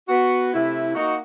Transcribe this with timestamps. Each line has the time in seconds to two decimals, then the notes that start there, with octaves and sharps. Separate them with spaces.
0.09 B3 F#4
0.54 C3 A3 E4
0.95 A#3 D#4 F#4